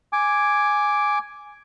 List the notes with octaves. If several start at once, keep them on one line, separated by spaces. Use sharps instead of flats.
G#5 D6